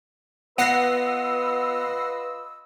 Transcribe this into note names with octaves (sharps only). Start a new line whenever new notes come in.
B3 F4 B4 D#5 F#5 E6 A#6 C7